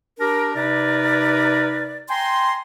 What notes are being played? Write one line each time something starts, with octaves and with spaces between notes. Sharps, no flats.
D4 G4 A#4
C3 D#4 A#4 B4 D5
G5 G#5 A#5 C6